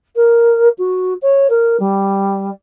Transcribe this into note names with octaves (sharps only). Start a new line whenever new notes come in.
A#4
F#4
C#5
A#4
G3